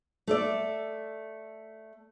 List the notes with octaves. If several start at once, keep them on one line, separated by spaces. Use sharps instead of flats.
A3 A4 D5